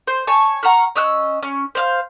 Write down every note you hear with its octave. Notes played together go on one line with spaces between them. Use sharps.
C5
C#5 G#5 A5 C#6
F#5 A#5 C#6 F6
C#4 D#5 E6 F#6
C#4
C5 F5 F6